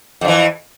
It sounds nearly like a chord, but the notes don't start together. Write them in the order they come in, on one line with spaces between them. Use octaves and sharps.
F2 D3 E3